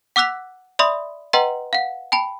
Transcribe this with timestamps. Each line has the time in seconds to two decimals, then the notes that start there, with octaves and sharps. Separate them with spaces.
0.16 F#5 D6 E6 F#6 B6 F7
0.79 D5 E5 B5 C6 D#6
1.33 B4 D#5 F#5 G5 A#5 C6
1.73 F5 F#5
2.12 G5 A5 B5